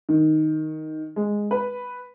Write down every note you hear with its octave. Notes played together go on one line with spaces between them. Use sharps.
D#3
G#3
B4